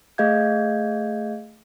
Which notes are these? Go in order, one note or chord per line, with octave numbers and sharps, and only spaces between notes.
A3 G#4 D#5 F5 G6 G#6